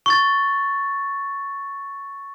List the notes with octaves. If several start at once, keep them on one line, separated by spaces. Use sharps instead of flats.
C#6 A6